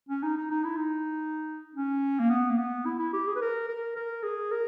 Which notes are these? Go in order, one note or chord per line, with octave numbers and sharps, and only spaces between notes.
C#4
D#4
D#4
D#4
E4
D#4
C#4
A#3
B3
A#3
B3
E4
E4
G4
G#4
B4
A#4
A#4
A#4
G#4
A#4